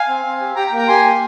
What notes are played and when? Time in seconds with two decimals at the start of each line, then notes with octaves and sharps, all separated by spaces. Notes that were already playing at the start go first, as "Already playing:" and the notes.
Already playing: F5 G#5
0.08 C4
0.25 C4
0.41 G4
0.56 G4 G5 A#5
0.67 G5 A#5
0.72 A#3
0.77 G5 A#5
0.88 G4 G#5 C6
1.05 A#3